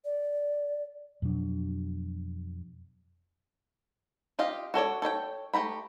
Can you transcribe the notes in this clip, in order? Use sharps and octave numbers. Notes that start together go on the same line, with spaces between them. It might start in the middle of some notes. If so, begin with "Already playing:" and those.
D5
F2 B2 F#3 D4
F4 G4 D#5 F5
F#4 A4 C#5 D5
A4 C#5 D#5 G5
A3 G4 A#5 B5